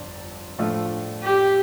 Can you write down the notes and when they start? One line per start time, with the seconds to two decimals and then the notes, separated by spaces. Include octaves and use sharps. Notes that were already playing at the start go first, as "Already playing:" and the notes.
Already playing: G1 F2 D4
0.58 A2 F3 A3 D4 F4
1.23 G4